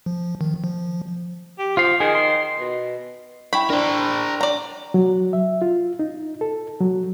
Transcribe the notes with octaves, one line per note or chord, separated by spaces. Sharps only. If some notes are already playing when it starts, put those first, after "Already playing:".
F3
D#3
F3
G4
F3 F4 F5
D#3 G#4
C6
B2
E4 G5 B5 C#6
D4 A#4 C5
D5 A#5
F#3
E5
F4
D#4
A4
F#3